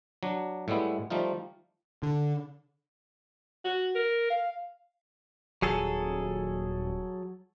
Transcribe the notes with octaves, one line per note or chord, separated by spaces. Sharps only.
F#3 D4
A2 G3 G#3 B3 E4
F3 G3 A3 D#4 F4
D3
F#4
A#4
F5
D#1 F#3 G#4 A4